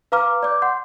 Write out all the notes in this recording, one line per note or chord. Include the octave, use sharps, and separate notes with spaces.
B4 F5 A#5 D6 F6
D5 D6 G6
F#5 C6 G6